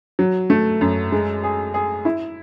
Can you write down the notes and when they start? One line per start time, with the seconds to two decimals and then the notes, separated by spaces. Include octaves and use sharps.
0.19 F#3
0.50 A3
0.81 F#2
1.12 G#3
1.43 G#4
1.74 G#4
2.05 E4